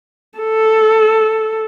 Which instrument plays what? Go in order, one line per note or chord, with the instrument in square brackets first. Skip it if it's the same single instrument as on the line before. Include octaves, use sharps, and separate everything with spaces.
[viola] A4